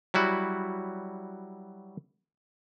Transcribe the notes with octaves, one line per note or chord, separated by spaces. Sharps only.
F#3 G3 E4 F#4